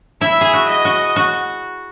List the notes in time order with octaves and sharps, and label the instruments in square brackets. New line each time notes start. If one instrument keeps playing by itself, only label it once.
[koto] E4 [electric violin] E5
[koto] G#4
F#4
[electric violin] D#5
[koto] F#4
F#4